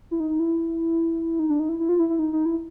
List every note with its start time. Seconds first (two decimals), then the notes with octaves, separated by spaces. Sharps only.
0.11 E4
0.20 D#4
0.39 E4
1.39 D#4
1.49 D4
1.59 D#4
1.69 E4
1.79 E4
1.89 F4
1.99 E4
2.09 E4
2.19 D#4
2.33 D#4
2.46 E4